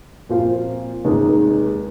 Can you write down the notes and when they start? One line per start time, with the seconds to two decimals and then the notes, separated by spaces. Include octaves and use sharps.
0.29 A#2 F3 C4 F4 C5
1.05 F1 D#2 D#3 G#3 D#4